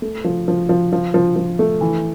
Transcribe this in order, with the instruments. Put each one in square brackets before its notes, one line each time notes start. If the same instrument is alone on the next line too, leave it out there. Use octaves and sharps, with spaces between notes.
[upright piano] A3
F3
F3
F3
F3
F3
F3
A3
E3